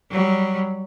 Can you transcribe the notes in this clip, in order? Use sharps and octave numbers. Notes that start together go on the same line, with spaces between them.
F#3 G3